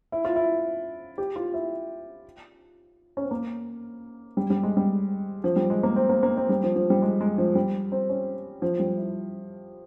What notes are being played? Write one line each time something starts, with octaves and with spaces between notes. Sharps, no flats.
E4
F4
E4
G4
F4
E4
C#4
C4
A#3
G3
G3
G#3
G3
F3
G3
G#3
A#3
C4
A#3
A#3
C4
G3
F3
F3
G3
G#3
G#3
F3
G3
C4
C#4
F3
G3
E4